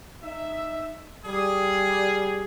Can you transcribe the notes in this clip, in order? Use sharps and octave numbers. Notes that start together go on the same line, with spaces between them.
D#4 E5
G3 G#4